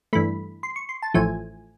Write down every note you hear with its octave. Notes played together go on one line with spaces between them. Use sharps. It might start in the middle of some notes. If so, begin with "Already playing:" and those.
G2 E3 A3 B5
C6
C#6
C6
A5
A1 A2 F3 A3 G#5